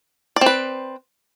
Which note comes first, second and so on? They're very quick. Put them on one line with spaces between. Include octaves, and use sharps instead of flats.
D5 C4 B4